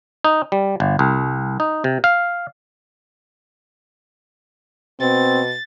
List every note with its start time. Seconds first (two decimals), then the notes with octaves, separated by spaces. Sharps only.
0.25 D#4
0.52 G3
0.80 G1
0.99 C2
1.60 D#4
1.84 C3
2.04 F5
5.00 B2 C4 A6